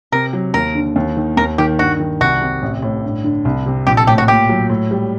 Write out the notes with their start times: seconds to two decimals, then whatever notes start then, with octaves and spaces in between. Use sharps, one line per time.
0.12 C3 A#4
0.33 F#3
0.54 D#2 A#4
0.75 D3
0.96 D#2
1.17 D#3
1.37 D#2 A#4
1.58 D#3 G4
1.79 G2 F#4
2.00 D#3
2.21 C2 F#4
2.41 C3
2.62 A1
2.82 A2
3.04 G2
3.24 D3
3.45 C2
3.66 C3
3.87 A#1 G4
3.97 A4
4.07 A2 G4
4.18 F#4
4.28 A#2 G4
4.49 F#3
4.70 A2
4.91 G3